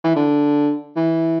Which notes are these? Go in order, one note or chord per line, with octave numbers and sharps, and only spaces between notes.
E3
D3
E3